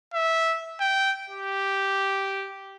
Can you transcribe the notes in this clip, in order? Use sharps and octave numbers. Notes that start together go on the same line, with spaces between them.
E5
G5
G4